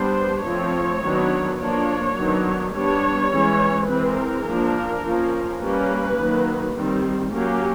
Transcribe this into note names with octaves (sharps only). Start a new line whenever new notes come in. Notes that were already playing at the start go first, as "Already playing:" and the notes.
Already playing: G3 B3 D4 C5
F3 A3 C4 C#5
D#3 F#3 B3 D4
F3 A#3 D4 C#5
D#3 F#3 B3 D4
G3 B3 D4 C#5
E3 G#3 C#4
E3 G#3 C4 B4
A#4
F3 A#3 D4
F3 A#3 C#4
G3 A#3 C#4 B4
D#3 F#3 A#3
D#3 G3 C4
F#3 A#3 C#4 G4